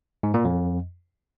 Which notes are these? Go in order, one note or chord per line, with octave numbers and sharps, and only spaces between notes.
G#2
A#2
F2